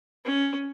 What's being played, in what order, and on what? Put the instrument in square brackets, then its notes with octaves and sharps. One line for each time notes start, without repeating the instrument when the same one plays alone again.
[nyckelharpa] C#4